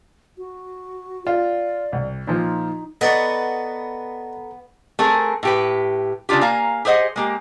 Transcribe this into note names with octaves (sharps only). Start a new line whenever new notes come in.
F#4
F4 D5
C2
A#2 F3 D#4
B3 F#4 A4 B4 D5 D#5 A#5
A3 C4 G#4 A#4
A2 G4 B4
C#3 D4 D#4 F4 G4
A#3 F5 G#5 A#5
G4 G#4 C5 D#5 F#5
G#3 A#3 G4